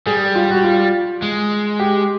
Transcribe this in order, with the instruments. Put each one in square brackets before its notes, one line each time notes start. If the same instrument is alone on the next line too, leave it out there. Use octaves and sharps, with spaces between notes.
[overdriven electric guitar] G3 [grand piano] G#4
[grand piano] F4
F#4
F4
[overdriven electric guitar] G#3
[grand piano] G4